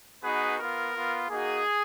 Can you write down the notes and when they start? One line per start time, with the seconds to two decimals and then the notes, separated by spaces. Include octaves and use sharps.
0.23 B3 D#4 F#4 G#4 B4
0.58 B3 F4 A#4
0.93 B3 F4
1.28 A#3 D#4 F#4 G#4